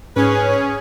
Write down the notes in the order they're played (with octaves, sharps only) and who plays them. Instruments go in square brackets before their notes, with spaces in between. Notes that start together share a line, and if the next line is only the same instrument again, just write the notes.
[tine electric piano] G#2 [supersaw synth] C#4 [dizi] G#4 [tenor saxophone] B4